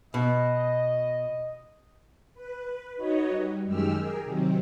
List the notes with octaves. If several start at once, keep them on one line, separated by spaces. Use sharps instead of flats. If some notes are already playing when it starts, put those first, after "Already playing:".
B2 D#5
B4
D#4 F#4 B4 C#5 D#5
G3
F#2 D#3 G#3 G4 E6 F6
G4 G#4 A#4
C3 D#3 F#3 C4